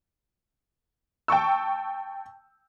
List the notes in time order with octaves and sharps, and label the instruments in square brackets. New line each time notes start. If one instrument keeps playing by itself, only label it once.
[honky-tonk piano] G5 A5 C#6 E6